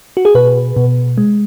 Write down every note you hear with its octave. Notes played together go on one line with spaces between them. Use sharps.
F#4
G#4
B2 B4
B2
G#3